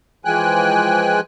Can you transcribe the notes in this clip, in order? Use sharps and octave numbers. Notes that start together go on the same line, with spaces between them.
E3 F3 G#3 G5 G#5 F#6